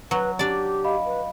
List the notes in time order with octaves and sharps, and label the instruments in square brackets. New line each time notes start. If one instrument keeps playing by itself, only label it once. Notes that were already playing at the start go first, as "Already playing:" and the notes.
[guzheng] F#3 [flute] B4
[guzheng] D4 D5 [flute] G4
[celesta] D#5 F5 B5
[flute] B4